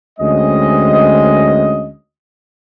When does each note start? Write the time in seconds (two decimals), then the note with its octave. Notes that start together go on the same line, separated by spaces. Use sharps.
0.19 D2 G#3 C4 C#4 D#5